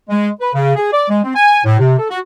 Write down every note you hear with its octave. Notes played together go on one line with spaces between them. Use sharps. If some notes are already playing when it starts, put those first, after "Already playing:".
G#3
B4
C#3
G#4
D5
G#3
C4
G#5
A2
C3
A4
F#4